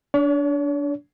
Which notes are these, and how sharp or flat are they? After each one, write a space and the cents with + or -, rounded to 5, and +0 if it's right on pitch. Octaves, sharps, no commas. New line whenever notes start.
D4 -20 C#5 +40